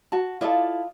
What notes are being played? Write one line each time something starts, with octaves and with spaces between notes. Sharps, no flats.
F#4 A5
E4 F4 A4 D5 D#5